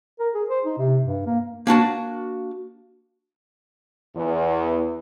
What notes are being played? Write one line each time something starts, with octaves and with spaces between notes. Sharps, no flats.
A#4
G#4
C5
D#4
C3
G2
A#3
A#3 D4 F#4 A5
E2